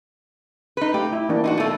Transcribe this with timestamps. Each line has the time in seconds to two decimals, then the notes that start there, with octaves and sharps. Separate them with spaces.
0.77 D#4 B4
0.94 A3 G4
1.13 E4
1.29 E3 A#3 D4
1.44 D#4 F4 F#4
1.58 B2 A3